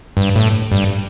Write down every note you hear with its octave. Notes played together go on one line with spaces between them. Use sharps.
G2
A2
G2